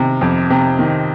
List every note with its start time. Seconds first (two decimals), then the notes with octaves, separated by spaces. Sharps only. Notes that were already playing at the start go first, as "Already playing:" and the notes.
Already playing: C3 D#3
0.21 F2
0.50 C3
0.79 D#3